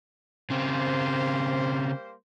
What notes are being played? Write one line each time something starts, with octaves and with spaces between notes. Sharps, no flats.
C#3 G3 A#3 C4 C5